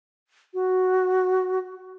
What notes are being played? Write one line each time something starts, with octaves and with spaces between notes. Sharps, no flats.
F#4